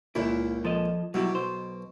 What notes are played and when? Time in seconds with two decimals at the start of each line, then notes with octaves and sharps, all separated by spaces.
0.15 C#2 A#2 A#3 E4
0.65 F3 A4 D#5
1.14 B2 F#3 G3 E4
1.35 B1 C5